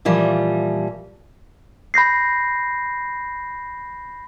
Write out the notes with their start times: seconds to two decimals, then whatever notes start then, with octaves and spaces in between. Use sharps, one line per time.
0.05 A#2 E3 F3 G3
1.94 B5 G6 A#6 C7